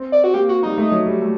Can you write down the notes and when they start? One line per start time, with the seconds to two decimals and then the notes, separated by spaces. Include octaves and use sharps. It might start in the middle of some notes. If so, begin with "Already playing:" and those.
Already playing: C4
0.12 D5
0.24 F#4
0.34 A#3 G4
0.49 F#4
0.63 G3 D#4
0.78 A3
0.92 F#3
1.06 G3
1.21 A3